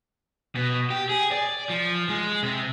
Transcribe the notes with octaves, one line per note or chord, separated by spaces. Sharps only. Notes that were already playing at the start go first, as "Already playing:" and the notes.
B2
G4
G#4
D5
F3
G#3
C3